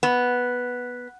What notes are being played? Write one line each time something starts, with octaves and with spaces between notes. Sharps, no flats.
B3